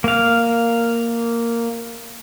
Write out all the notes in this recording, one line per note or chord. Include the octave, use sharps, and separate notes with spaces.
A#3 F5